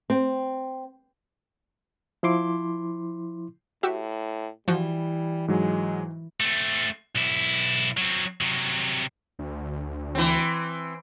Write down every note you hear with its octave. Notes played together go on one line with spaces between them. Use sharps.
C4
F3 E4 C6 D6
A2 F#4 G4 E5
E3 F3 G3 F#4
G#2 F#3 G#3
A3 C4
B1 E4
F#3 C4
C3 F#3
D2
E3 C4